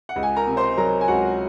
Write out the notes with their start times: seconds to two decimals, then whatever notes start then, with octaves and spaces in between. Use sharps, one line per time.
0.09 F#5
0.16 C#2
0.23 G#5
0.36 A#4 A#5
0.47 C3
0.57 C5 C6
0.77 F#3 A#4 A#5
1.01 G#5
1.08 C#2 F#4 F#5